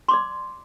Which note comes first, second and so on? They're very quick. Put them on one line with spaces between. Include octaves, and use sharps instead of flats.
C6 D6 D5